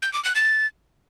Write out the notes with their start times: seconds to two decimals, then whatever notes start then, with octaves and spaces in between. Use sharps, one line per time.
0.02 G6
0.13 D6
0.24 F#6
0.35 A6